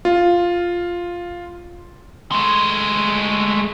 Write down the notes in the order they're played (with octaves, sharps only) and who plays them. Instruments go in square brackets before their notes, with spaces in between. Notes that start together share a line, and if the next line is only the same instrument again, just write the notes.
[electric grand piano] F4
[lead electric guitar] G#3 A3